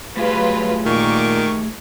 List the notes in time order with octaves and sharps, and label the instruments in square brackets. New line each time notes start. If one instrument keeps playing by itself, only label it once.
[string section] F#3 F4 B4 [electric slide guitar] A3 G4 G#4
[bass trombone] A#2 [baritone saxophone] D#3 [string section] C#6 D6